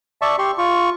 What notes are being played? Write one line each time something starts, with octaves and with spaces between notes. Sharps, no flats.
D5 E5 A5 C#6
G4 C6 C#6
F4 C#6